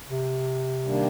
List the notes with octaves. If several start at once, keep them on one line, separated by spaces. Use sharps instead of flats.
C3
D#3 G3 A#3 D4